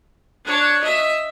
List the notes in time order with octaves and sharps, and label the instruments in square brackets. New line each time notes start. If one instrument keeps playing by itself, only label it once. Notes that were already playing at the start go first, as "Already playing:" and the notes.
[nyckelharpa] D4 C#5
D#5 E5